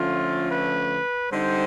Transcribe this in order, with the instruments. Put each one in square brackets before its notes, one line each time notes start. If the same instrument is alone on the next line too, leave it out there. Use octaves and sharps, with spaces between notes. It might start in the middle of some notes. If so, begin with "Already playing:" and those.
Already playing: [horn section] D3 F3 A3 C#4 F4
B4
D3 G3 C4 D#4 C5